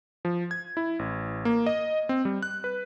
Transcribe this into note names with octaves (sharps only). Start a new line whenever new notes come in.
F3
G#6
E4
A1
A#3
D#5
C4
G3
F#6
B4